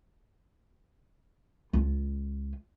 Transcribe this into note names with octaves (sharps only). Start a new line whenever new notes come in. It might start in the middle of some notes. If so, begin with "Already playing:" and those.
C#2 F4